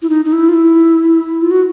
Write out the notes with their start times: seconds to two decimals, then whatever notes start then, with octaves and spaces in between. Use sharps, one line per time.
0.02 E4
0.10 D#4
0.25 D#4
0.32 E4
0.49 F4
0.54 E4
1.42 F4
1.51 F#4